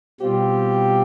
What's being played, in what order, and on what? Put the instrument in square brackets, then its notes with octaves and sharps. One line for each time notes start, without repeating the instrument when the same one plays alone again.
[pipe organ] B2 G3 C4 F4 [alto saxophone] G4